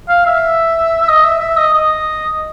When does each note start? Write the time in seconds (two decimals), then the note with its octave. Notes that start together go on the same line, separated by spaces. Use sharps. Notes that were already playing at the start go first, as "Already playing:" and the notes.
0.09 F5
0.26 E5
1.01 E5
1.08 D#5
1.24 E5
1.40 E5
1.57 D#5
1.74 D#5